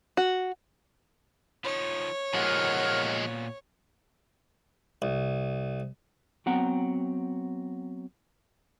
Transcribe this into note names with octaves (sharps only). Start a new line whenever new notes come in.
F#4
F3 D#4 C#5
D#2 A#2 F3 G#3 B3 F#5 F6
C2
F#3 B3 C4 F#5 G5 A#5